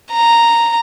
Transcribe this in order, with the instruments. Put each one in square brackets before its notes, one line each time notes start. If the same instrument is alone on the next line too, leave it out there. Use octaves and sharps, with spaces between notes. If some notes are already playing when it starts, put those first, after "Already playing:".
[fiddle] A#5